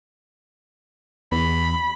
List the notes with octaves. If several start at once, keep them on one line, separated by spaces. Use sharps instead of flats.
E2 B5